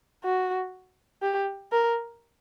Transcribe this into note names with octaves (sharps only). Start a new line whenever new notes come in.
F#4
G4
A#4